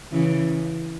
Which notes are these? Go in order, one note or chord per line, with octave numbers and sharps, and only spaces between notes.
C#3 E3